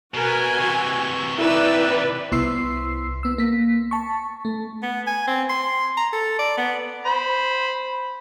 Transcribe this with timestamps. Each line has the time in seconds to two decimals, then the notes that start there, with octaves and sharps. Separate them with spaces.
0.14 B2 F#4 A#4 B4 G#5
0.58 C3 E3 C#6
1.39 D#4 E4 B4 D5 E6
2.32 C2 B3 E4 C6 E6 C7
3.23 B3 E6
3.38 A#3 B6
3.91 A5 C#6
4.45 A3
4.83 B3
5.07 G#5
5.28 C4
5.50 C6
5.97 A#5
6.13 A4
6.39 D5
6.58 B3
7.05 C5 B5